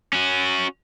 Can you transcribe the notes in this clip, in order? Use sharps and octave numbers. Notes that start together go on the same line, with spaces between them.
C#4 F#4